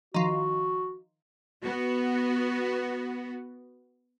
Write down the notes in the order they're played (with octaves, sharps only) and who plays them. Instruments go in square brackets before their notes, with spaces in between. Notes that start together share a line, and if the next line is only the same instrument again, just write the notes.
[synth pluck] D#3 F3 [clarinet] F#4
[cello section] B3 F#4